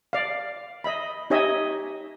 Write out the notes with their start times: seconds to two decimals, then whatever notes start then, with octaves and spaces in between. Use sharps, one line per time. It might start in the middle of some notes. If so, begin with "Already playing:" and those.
0.13 D5 F5
0.84 D#5 E5 B5
1.30 D#4 G4 C#5 D#5 E5 G#5